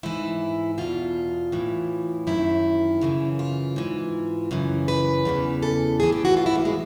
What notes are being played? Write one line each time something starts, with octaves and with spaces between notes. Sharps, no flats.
G#2 E3 E4
E2 B2 F4
A2 E3
F#2 D#3 E4
F#2 C#3 E3
F4
G#2 E3
F#2 C#3 E3
B4
E2 C#3 E3
A4
A2 E3 G#4
G4
F#4
F4
E4
A#3
G#3